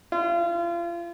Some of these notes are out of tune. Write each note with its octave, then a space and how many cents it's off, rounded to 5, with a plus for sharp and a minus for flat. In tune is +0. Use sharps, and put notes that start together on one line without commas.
F4 -35